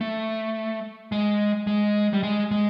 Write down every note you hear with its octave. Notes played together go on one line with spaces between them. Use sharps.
A3
G#3
G#3
G3
G#3
G#3